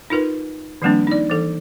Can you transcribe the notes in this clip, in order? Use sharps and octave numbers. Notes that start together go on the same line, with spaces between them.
D#4 F4 A#4 B4
D#3 F3 G3 A#3 C4 D4
D#4 D5
E3 A4